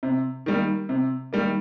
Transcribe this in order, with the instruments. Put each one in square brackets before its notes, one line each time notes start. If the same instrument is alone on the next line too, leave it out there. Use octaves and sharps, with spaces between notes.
[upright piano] C3
D#3 G3 A#3
C3
D#3 G3 A#3